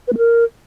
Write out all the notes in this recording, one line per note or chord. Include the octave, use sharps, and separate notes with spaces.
B4
A3
A#4